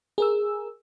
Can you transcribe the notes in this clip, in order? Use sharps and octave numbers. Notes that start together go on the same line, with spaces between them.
G#4 A#4 E6